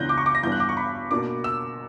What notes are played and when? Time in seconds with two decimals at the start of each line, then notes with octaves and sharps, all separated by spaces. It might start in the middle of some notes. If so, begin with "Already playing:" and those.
Already playing: C#2 C#3 E3 B3 D4 F#6 G6 A#6
0.09 D6
0.18 C#6
0.26 D6
0.35 A#6
0.43 G2 E3 B3 D4 G6
0.52 F#6
0.60 D6
0.69 C#6
0.77 B5
1.11 B2 A#3 D4 D6
1.44 E6